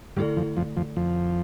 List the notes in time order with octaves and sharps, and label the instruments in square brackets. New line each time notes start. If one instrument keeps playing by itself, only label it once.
[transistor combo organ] G2 G3 [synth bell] D3 A3 E4 A4 D5
[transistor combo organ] F2 F3
F2 F3
F2 F3
F2 F3